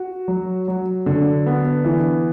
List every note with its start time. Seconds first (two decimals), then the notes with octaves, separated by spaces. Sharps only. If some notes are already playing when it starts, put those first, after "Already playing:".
Already playing: F#4
0.28 F#3
0.68 F#3
1.06 D3
1.46 B3
1.85 E3